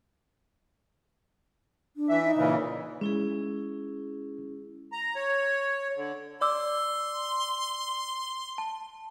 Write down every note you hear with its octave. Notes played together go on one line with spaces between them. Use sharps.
D4
E3 E5
D#4
A#2 C#3 E3
G#3 C#4 E4 G#4
A#5
C#5
D3
D5 C6 D6 E6
A5